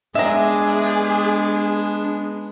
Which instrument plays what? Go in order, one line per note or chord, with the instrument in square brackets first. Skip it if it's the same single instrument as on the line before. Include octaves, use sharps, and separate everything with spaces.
[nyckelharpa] G#3 B3 [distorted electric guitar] D4 [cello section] G#4 [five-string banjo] E5 A#5